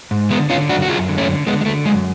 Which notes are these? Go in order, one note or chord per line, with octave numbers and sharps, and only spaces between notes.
G#2
D3 G#3 B3
D3 C#4 F4
F#2 D4 F#4
F#4
F#2 F4 G#4
D3
A3 C#4
D3
D3 G#3 B3
G#3
D3 A3
F#2 G#3